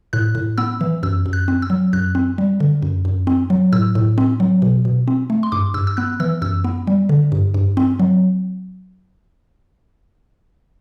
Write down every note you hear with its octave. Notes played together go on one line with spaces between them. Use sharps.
A2 F#6
A2
B3 E6
E3
F#2 E6
F#2
F#6
C4
E6
F#3
F#2 F#6
C4
G3
D3
F#2
F#2
C4
F#3
A2 E6
A2
C4
F#3
B2
B2
C4
A3
C6
G2 D6
G2 E6
E6
B3 F#6
E3 E6
F#2 E6
B3
G3
D3
G2
G2
C4
F#3